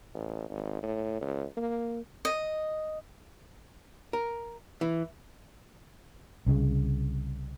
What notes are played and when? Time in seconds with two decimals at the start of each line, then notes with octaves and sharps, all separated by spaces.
0.14 A1
0.49 G#1
0.83 A2
1.21 C#2
1.57 A#3
2.25 D#5
4.13 A#4
4.81 E3
6.46 C2 C#3